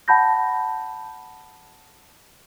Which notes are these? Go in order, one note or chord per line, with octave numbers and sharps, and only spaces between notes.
F#5 A5 B5 G6 A#6